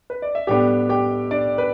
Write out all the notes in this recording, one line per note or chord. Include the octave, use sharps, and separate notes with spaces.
B4
D5
E5
A2 G3 B3 D4 G4 G5
G4 G5
D4 D5
B4